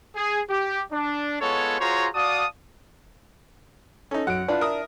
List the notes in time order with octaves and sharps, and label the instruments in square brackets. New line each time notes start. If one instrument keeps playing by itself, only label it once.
[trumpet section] G#4
G4
D4
G#3 B3 F4 A4 C#5
F4 F#4 G#4 C5 C#5 A#5
F#4 D5 F5 A5 D#6
[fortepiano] C#4 D#4 [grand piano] A4
[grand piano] F#2 F#3 D7 [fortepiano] F#5
[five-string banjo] D4 E4 [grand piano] F4 B4 B5
[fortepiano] A#4 D#6 [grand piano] E5